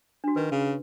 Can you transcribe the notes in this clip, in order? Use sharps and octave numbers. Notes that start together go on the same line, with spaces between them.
D4 F#4
D#3 B4
C#3